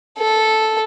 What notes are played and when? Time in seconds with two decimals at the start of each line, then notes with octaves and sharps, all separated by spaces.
0.18 A4